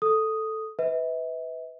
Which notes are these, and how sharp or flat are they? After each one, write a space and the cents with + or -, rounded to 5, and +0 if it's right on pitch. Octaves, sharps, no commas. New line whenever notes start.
A4 +0 D#6 +0
B4 +15 E5 -40